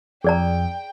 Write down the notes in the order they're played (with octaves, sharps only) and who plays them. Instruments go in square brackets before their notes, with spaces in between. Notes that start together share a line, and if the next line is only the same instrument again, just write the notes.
[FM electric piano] F2 [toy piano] G#4 D5 A#5 [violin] G5